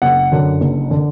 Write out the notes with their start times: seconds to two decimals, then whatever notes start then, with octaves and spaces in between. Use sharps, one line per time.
0.02 F#1 F#5
0.32 F#2 D3
0.61 F#1
0.91 D3